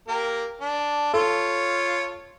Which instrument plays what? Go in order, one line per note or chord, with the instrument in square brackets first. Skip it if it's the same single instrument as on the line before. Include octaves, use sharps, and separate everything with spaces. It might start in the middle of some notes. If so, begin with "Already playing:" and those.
[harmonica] A#3 G4 A#4
D4
[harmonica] F4 C#5 [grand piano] A4